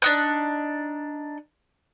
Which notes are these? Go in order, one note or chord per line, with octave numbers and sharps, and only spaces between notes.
D4 D#4 F#6